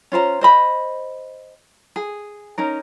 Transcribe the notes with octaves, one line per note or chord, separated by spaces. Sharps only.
C#4 F4 C5 A#5
C5 D#5 B5
G#4
C#4 D#4 A#4